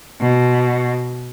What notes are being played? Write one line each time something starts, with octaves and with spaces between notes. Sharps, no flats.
B2